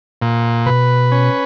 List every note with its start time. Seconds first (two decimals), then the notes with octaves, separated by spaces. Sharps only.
0.22 A#2
0.66 B2 B4
1.12 C#4